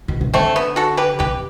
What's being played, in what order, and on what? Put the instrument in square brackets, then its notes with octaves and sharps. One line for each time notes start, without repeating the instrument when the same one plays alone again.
[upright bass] B2
C3
[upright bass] D3 [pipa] A3 C4
[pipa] B3
F#4 A4
G4 B4
[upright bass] C3 [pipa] G4 B4